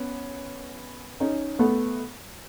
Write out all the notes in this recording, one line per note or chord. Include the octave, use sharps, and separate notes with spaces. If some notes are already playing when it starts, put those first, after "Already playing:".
Already playing: B3 C#4
C#4 D#4
A3 B3